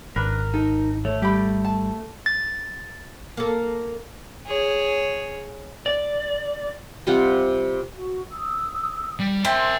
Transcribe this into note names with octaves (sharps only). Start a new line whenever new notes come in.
G#1 D4 A#4 B4 B5
D#4 A4
A3 C#5
G3 G4 B5
A5
A6
A#3 A4
G#4 C#5
D5
C3 G3 F4 F#5
F#4
D#6 E6
G3
C4 A#4 E5 C6